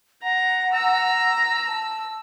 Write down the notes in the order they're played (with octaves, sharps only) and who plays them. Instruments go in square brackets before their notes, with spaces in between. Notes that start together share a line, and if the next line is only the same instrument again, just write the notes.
[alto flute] F#5 [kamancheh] A#5
[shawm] A#5 [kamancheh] E6
[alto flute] A5